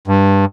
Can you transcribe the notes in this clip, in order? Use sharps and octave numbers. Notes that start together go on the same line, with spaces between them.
G2